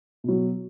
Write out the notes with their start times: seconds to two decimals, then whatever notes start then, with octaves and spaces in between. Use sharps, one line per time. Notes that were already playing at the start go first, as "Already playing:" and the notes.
0.24 B2 F#3